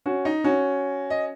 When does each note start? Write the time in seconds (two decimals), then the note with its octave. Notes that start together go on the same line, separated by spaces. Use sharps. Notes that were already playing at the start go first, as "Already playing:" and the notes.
0.06 C#4 F#4
0.25 D#4
0.44 C#4 F#4
1.10 D#5